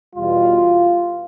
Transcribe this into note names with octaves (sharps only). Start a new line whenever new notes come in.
E2 B2 G3 F4